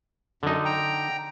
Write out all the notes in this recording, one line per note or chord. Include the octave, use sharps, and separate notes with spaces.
F#2 D3 D#4
G5 A#5